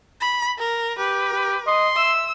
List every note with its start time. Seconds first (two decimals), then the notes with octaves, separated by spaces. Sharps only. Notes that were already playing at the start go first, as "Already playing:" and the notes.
0.21 B5
0.58 A#4
0.98 G4 B4
1.32 G4
1.67 D#5 C6
1.97 E5 E6